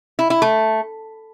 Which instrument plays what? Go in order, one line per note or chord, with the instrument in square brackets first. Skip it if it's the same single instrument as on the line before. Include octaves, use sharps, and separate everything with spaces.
[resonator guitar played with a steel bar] E4
E4
A3